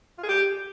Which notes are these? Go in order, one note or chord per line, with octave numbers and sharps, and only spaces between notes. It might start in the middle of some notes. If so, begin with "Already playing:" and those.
F4
G#4
G4